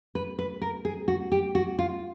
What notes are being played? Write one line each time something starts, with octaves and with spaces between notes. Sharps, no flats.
B4
B4
A#4
G#4
F#4
G4
F#4
F4